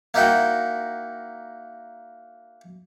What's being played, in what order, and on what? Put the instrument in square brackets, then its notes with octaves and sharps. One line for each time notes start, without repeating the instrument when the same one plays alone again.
[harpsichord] A#3 D#4 E4 F#4 G5